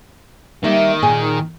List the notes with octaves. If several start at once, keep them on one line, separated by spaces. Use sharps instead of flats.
D#3 G3 A#3 E5
A#2 G#4 G#5